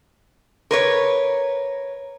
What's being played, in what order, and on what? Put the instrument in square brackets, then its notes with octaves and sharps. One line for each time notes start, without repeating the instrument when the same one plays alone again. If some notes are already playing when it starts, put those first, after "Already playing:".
[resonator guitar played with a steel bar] A#4 B4 C#5